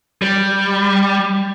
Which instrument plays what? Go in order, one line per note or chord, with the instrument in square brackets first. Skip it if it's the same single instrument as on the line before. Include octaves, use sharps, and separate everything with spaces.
[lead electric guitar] G3